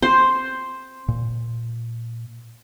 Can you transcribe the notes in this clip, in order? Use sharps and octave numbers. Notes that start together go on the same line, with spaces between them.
C4 C5
A#2